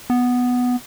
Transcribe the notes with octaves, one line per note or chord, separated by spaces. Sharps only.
B3